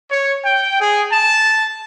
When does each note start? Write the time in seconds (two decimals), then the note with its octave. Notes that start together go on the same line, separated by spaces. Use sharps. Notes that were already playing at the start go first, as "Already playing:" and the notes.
0.11 C#5
0.43 G5
0.81 G#4
1.11 A5